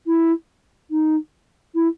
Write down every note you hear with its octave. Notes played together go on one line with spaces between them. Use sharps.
E4
D#4
E4